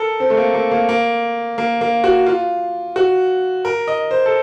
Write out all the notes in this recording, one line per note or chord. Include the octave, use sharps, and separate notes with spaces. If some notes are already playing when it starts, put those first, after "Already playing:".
Already playing: A4 A#4
C4
A3
A#3
A#3
A#3
A#3
A#3
A#3
F#4
F4
F#4
A#4
D#5
C5
A4